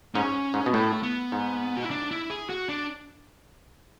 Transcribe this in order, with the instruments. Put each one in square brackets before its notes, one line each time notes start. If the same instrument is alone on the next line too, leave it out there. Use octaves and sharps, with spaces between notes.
[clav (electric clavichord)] G#2 [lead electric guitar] C#4
[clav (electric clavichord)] G#2
B2
[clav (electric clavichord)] A2 [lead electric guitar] A3
[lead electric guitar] B3
[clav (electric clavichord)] G#2
[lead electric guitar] F#4
E4
D4
E4
G#4
F#4
D4